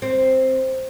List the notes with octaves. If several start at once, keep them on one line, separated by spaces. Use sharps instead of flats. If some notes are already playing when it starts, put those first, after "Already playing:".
C4